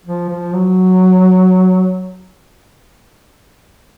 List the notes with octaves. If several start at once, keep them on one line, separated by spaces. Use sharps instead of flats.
F3
F3
F#3